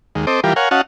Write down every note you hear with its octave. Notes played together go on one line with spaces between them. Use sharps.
D#2 G#3
C4 A4 C5 D#5 D6
E3 G3 F4 G4 A#4
A#4 C#5 F5 F#5 G#5
C#4 F#4 D#5 F5 F#5 A5